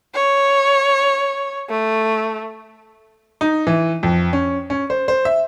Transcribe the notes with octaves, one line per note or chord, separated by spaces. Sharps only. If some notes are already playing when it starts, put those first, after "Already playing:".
C#5
A3
D#4
E3
F2
C#4
C#4
C5
C5
E5